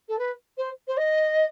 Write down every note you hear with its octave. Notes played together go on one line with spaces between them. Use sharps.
A4
B4
C5
C5
D#5